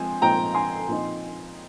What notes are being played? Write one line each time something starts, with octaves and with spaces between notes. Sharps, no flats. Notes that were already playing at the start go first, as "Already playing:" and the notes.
Already playing: F3 G#3 C4 G#5
A#2 F3 G#3 C4 D#4 G5 A#5
G#5 C6
A#2 F3 C4 D#4